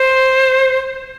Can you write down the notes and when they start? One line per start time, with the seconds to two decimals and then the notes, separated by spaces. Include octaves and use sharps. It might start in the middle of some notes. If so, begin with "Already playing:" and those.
Already playing: C5